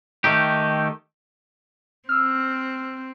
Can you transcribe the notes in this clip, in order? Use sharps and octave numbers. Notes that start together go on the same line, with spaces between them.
D#3 A3 D#4 G4
C4 E6 F6